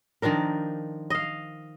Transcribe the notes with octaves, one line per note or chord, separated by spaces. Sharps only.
D#3 F3 D4 A#4
D#5 F5